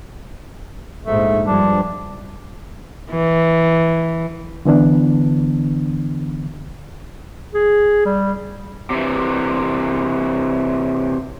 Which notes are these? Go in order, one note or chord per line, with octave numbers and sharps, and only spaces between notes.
A#1 G#2 A3
G2 F3 D4
E3
D3 E3 B3 D4
G#4
G3
C3 E3